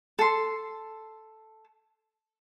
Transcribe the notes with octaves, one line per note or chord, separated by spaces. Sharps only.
A4 C6